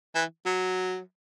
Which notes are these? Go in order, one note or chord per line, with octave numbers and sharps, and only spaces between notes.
E3
F#3